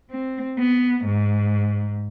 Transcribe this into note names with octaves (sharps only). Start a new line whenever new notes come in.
C4
B3
G#2